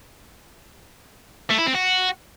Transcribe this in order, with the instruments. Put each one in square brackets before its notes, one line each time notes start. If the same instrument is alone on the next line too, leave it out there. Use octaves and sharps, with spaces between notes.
[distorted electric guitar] A3
E4
C4
F#4